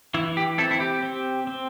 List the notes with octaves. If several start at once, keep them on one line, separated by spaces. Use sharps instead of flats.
E3 E4
G4
C4 E4 A4
E4
G4
C4
C4